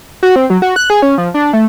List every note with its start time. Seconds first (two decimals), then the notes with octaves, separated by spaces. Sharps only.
0.23 F#4
0.36 C4
0.50 F#3
0.62 F#4
0.76 F#6
0.90 G#4
1.02 C#4
1.18 F3
1.34 D4
1.53 A3